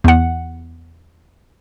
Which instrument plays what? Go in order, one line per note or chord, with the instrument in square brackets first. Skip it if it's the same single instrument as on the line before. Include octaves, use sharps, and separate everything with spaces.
[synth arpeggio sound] E2 F#5